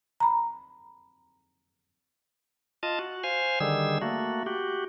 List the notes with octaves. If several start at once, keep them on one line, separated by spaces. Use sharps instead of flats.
A#5 B5
F4 D#5 A5
F#4
C5 F5 G#5
D3 D#3 G3 G#4 E6
A3 A#3 F#4
F#4 G4